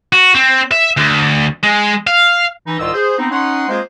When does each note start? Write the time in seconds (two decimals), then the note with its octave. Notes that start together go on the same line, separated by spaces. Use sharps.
0.13 F#4
0.35 C4
0.71 E5
0.97 D2
1.63 G#3
2.07 F5
2.67 E3 D#4
2.80 C2 G#2 D#3 F4 D#5 E6
2.94 G#4 C5
3.19 B3 C4 D#4
3.32 C#4 D#4 F#5 C6
3.69 G#3 A#3 C4 F4 G#4 C5